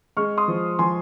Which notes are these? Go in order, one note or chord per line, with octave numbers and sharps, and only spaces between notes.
G#3 C#6 F6
C6 D#6
F3
F3 G#5 C6